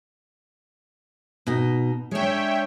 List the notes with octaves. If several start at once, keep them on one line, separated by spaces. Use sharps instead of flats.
B2 D#4
G#3 D4 C#5 E5 G5